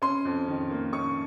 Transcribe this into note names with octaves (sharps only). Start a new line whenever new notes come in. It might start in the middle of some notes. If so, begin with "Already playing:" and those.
C#4 C6
F2
D#3
A#3
C#4 C#6